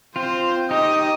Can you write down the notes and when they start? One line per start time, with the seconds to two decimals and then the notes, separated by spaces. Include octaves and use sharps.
0.16 C4 F4 C5
0.71 D#4 G4 D#5